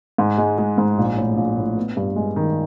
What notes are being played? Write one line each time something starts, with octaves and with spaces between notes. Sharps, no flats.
G#2
G#3
G#3
G#2
A#1
A2
A#1
A2
B3
G2
G#3
D#3